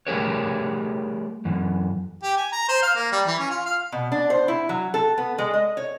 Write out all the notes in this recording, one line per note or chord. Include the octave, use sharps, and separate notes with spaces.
G3 A3 G4 G#4 A#4 C#5
F#2 E3
G4
G#5
A#5
C5
F5
A#3
G3
E3
C#4
F4
F5
B2
D4
C5
E4
F#3
A4
B3
G#3
D#5
C#5